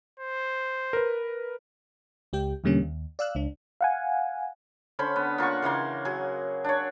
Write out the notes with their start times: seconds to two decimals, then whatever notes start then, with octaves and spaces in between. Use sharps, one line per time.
0.20 C5
0.93 A#4 B4
2.33 C#2 G4 G5
2.64 E2 B2 D3 G3 A#3 C#4
2.82 D#2
3.19 D5 F5 E6 F#6
3.35 C#2 D4
3.81 F5 F#5 G#5
4.99 D3 C#4 C5 B5
5.16 B3
5.38 A#3 F4 F#5 C#6
5.62 C#3 E3 A#3 C6
6.05 F#3 G#4
6.64 D4 C#5